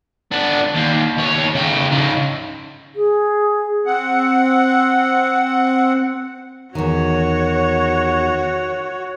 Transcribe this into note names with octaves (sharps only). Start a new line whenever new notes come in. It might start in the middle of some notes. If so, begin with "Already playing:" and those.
B3 D4
D#2
D#2 C#5
C#3 G5
C#3 D#4
G#4
C4 F#5
E2 D#3 F#4 C#5